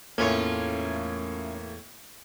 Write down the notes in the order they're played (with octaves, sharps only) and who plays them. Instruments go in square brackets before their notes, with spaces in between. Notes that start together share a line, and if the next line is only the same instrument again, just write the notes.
[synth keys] E2 A3 G#6 [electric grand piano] A2 A#3 [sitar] C#4 F4 C#5